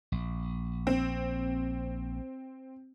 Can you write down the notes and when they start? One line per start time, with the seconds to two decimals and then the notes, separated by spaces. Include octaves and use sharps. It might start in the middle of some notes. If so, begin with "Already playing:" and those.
0.12 A#1
0.87 C4